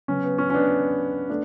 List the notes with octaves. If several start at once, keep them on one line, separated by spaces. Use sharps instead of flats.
C#3 F#3 B3 C#4
B3
C#4
C#4
B3 D4
A3 B3 D4